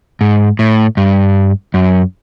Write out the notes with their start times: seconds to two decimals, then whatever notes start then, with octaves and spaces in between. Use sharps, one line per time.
0.21 G#2
0.59 A2
0.97 G2
1.74 F#2